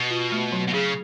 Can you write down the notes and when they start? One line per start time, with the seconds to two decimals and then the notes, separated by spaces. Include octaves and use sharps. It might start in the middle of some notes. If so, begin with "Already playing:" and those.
Already playing: B2
0.11 F4
0.32 A3
0.52 F#3
0.68 B2
0.73 C#3 G#4